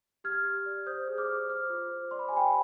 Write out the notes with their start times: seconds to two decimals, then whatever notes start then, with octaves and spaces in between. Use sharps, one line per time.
0.24 G4 F6 G#6
0.45 G4
0.66 D5
0.86 C5 D#6 G6
1.07 G#4
1.18 D6 F6
1.28 C5
1.49 C5 D6 F6
1.69 F4
1.91 C5
2.11 D5 C6
2.19 B5
2.28 G#5
2.32 G4 G5 B5